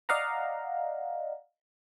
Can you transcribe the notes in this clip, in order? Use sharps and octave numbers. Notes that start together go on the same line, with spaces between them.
D5 D#5 F5 F#5 A#5